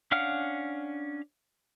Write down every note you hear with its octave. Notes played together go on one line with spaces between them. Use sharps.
C#4 D4 F5 F#5 F6